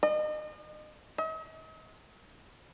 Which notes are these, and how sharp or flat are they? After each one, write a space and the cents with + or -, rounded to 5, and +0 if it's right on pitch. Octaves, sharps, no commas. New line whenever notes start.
D#5 -35
D#5 +45